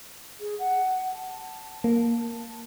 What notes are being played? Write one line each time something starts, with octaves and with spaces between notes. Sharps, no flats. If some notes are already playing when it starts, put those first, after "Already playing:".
G#4
F#5
A5
A#3